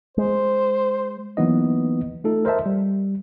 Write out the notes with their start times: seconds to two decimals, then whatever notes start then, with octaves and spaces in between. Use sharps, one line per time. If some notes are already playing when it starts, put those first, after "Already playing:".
0.18 G#3 C5
1.37 E3 F#3 A#3 B3 D#4 D#5
2.24 A3 D#4 F4 A4
2.45 A#4 C5 D#5 E5 A5
2.66 G3